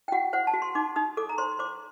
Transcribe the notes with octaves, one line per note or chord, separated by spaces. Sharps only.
G5
F#4 F#5
C5 F#5
A5
F#4
C6
D#4 D6
D#4 D#6
A4 D6
A#5
C5 C6
C5 D6